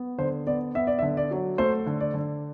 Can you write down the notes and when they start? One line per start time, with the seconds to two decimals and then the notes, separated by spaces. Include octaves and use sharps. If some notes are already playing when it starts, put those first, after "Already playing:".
Already playing: B3
0.18 D3 C5
0.47 B3 D5
0.75 B3 E5
0.87 D5
0.99 E5
1.02 D3
1.17 D5
1.31 F#3
1.58 A3 C5
1.86 D3
2.00 D5
2.14 D3